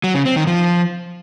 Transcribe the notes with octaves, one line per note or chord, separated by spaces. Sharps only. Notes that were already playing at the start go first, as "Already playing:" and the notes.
F#3
C#3
C4
D#3
F3